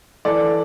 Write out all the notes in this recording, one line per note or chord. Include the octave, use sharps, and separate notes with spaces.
E3 A4 D5